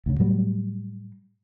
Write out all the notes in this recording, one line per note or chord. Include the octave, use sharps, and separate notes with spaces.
D2 C#3
A2 F#3 G3